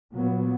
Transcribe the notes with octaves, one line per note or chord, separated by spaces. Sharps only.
A#2 F#3 B3